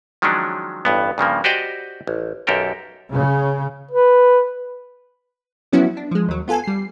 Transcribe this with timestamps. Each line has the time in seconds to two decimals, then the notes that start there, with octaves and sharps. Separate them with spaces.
0.22 D#3 F3 F#3 G#3 C#4 D4
0.85 A1 G2 B3
1.18 G2 C#3 F3 A#3
1.44 F#4 G4 C5 D5 D#5 G5
2.07 A1
2.47 B1 F#2 G4 A4 A#4 G5
3.14 C#3
3.91 B4
5.72 F3 F#3 B3 C#4 E4 F#4
5.97 D4
6.11 F3 G#3
6.28 D#2 F#3
6.48 B3 F4 A4 G#5
6.64 G3 C7